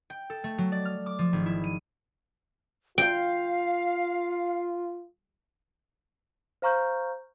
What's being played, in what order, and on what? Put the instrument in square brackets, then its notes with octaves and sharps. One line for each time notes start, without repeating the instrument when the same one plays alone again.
[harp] G5
A4
A3
F#3
D5
F6
D6
F3
G#1
E4
D#7
[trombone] F4 [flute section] F5 [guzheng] G5
[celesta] C5 F5 A#5 C#6 F6 G6